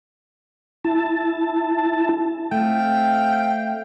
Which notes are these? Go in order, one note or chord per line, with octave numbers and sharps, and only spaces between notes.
E4 A5
A3 C4 E5 F5 G5